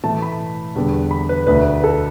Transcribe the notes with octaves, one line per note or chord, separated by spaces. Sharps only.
A2 E3 A3 A5
B5
E2 D3 G3 B3
B5
B4
D2 D3 A3 B4
B4
A4